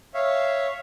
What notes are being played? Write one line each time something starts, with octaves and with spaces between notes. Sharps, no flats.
C#5 E5 F5